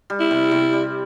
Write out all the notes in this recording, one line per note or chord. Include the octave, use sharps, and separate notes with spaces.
G3
E4
C3
C3
G3